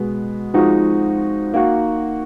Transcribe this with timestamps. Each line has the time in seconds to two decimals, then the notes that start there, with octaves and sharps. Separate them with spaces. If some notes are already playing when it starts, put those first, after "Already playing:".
Already playing: B2 G#3 B3
0.54 F3 G#3 C4 D#4 F#4
1.54 A#3 D#4 F#4